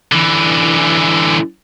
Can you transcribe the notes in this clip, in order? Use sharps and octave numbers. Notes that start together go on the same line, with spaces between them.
D3 E3